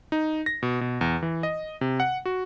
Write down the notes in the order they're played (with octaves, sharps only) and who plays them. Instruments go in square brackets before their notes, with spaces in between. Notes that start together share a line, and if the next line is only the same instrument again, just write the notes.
[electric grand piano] D#4
A#6
B2
B2
E2
E3
D#5
C3
F#5
F#4